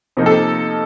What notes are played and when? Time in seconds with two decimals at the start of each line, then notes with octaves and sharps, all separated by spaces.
0.17 C3 F3 A#3 D#4
0.26 A4